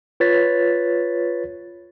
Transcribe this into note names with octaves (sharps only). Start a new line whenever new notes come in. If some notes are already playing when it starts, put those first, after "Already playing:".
F4 B4 C#5 A6 B6